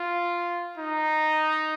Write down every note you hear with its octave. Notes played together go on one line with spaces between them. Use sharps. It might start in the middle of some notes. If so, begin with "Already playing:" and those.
Already playing: F4
D#4